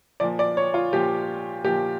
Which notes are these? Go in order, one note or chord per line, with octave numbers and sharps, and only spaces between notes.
A#2 F3 D5
D5
C#5
F4
A#2 F3 G4
A#2 F3 G4